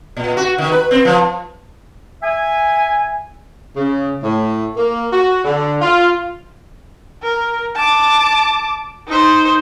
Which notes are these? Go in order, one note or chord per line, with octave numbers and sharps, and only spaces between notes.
A#2
F#4
D#3
B4
C4
F3
E5 G#5
C#3
A2
A#3
F#4
D3
F4
A#4
A5 D6
D#4 C5